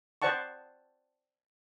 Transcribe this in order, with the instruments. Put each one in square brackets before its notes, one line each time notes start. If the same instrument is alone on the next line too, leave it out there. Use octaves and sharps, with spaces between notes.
[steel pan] C5 D5 F#5 A5 C#6